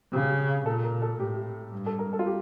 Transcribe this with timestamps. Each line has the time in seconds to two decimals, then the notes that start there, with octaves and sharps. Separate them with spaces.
0.13 C#3 G4
0.66 A#2 A4
0.84 A#4
1.02 A4
1.19 A2 G4
1.72 G2
1.86 A4
1.99 A#4
2.13 A4
2.19 F4
2.26 G4